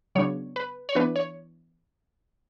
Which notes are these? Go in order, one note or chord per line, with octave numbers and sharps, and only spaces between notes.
C#3 F#3 B3 D4 C#5
B4
C#5
E3 B3 D4 B4
C#5